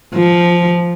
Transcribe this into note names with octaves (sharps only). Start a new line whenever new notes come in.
F3